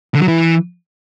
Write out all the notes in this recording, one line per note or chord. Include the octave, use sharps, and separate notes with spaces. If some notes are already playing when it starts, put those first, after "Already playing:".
D3
F#3
E3